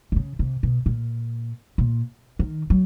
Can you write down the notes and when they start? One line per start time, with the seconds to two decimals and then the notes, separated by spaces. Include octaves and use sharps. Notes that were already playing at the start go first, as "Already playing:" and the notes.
0.12 D3
0.16 C#3
0.39 C3
0.63 B2
0.86 A#2
1.78 A#2
2.39 D#3
2.70 F#3